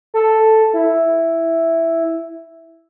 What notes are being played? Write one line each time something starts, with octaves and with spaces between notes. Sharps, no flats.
A4
E4